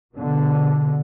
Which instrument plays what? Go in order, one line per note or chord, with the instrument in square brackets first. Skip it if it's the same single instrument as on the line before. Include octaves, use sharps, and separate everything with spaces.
[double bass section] B2 D3